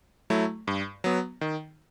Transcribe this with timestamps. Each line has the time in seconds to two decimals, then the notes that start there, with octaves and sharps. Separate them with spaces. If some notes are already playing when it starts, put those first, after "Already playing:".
0.30 F#3 A3 E4
0.67 G2
1.04 F#3 B3
1.41 D#3